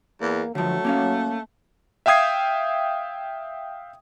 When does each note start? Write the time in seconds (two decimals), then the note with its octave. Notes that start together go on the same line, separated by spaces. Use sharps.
0.21 E2 A#3
0.55 D3 F3 F#3 A3
0.85 A#3 C#4 F5
2.06 E5 F5 G5 D#6 G#6 C7